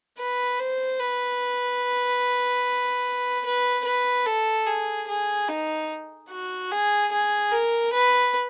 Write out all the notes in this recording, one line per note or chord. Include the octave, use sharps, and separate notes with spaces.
B4
C5
B4
B4
B4
A4
G#4
G#4
D#4
F#4
G#4
G#4
A#4
B4